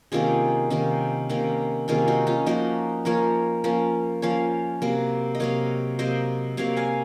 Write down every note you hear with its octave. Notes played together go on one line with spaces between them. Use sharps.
C3 D#3 A#3 C#4 F4 G#4
C3 D#3 A#3 C#4
C3 D#3 A#3 C#4
C3 D#3 A#3 C#4 F4 G#4
D#4 F#4
C#4 F4
F3 A#3 C#4 D#4 F#4
F3 A#3 C#4 A#4 C#5
F3 A#3 C#4
F3 A#3 C#4 C#5 F5
C3 F#3 A#3
D#5
C3 F#3 A#3 C#5 F5
C3 F#3 A#3 C5 D#5
C3 F#3 A#3 C#5 F5
F5 G#5